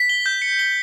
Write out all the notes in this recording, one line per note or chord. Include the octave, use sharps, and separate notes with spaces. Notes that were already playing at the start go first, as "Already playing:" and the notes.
Already playing: B6
G7
G6
C#7
G7